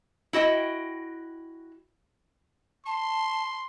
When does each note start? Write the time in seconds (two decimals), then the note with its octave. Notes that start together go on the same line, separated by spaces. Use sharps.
0.33 E4 F#4 D#5 G5
2.86 A5 C6